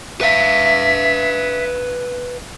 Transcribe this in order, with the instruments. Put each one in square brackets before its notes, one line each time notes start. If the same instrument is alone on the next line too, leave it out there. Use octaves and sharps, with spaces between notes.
[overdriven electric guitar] B4 F5 [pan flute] E5